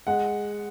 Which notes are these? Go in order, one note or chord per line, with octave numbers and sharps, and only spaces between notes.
G#3 F#5